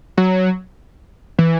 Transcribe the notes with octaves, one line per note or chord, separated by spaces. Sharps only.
F#3
E3